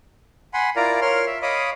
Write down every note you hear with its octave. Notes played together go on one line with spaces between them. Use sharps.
F#5 G#5 B5 C6
E4 F4 A#4 D5 F5 A#5
A#4 C#5 C6 F6
E5
C#5 D#5 F5 B5 D6 D#6